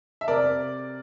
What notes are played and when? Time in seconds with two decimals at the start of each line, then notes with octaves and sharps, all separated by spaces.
0.21 E5
0.28 C3 A#4 D5